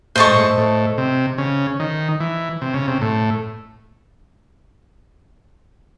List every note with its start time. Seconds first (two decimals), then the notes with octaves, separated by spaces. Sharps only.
0.16 A2 C5 D#5 A5 C#6
0.27 G#2
0.36 A2
0.57 A2
0.98 C3
1.38 C#3
1.80 D#3
2.20 E3
2.62 C3
2.74 C#3
2.87 C3
3.01 A2